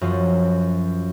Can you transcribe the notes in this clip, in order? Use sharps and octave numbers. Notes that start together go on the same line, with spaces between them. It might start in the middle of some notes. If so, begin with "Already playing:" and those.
F#2 F3